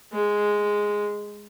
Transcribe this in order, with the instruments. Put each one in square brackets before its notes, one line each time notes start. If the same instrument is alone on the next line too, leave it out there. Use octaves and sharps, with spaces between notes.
[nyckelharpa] G#3